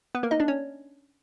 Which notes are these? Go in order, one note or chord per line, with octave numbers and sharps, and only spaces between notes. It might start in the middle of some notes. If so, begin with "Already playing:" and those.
B3 B4
A#3 A#4
D#4 D#5
D4 D5
C#4 C#5